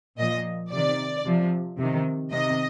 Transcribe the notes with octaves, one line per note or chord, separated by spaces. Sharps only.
A#2 F3 D#5
C3 D#3 D5
C3 F3
C3 D#3
C3 D#3 D#5